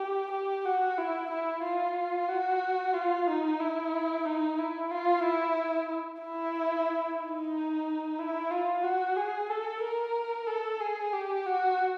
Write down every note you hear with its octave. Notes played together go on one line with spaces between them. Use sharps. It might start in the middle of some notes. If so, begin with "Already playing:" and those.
Already playing: G4
G4
F#4
E4
E4
F4
F#4
F4
D#4
E4
D#4
E4
F4
E4
E4
D#4
E4
F4
F#4
G#4
A4
A#4
A4
G#4
G4
F#4